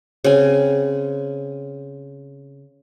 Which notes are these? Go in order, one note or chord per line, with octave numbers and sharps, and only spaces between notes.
C#3 C4 G#5